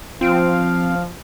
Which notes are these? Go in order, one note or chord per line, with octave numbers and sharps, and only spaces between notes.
F3 C4 F4 F5 D7